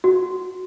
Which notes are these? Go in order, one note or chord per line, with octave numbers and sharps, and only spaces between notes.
F#4